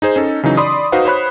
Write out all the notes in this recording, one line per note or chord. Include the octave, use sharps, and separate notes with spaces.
D#4 G#4 C5
C#4 D#4 A4
C#3 E3 F#3 D#4
D5 B5 C6 D#6
D#4 F#4 B4 C5 F5 F#5
C5 C#5 B5 F#6